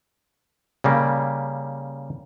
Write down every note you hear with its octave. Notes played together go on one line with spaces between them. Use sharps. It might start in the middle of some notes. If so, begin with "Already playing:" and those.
C#3 G3 A#3